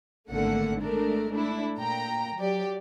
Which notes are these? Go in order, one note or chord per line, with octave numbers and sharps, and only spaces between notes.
G#1 D3 A3 A#3 F#5
G#3 A3 D4 A#4
A3 D4 E4
A#2 G5 A#5
F#3 G4 D5